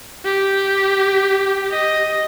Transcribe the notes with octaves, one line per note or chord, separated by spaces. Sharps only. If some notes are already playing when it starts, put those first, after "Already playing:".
G4
D#5